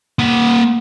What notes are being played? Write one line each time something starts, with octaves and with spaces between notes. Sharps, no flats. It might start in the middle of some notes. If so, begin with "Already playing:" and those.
A#3 F#5